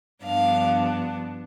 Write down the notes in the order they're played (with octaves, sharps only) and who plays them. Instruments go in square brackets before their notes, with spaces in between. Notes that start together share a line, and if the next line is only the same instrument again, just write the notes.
[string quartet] G2 F3 B3 D4 F5